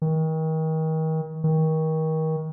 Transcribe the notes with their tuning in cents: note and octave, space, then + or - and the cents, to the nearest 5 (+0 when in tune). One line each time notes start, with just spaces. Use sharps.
D#3 +35
D#3 +30